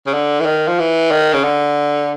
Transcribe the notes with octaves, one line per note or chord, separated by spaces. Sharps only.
C#3
D3
E3
D#3
F3
E3
D#3
C#3
D3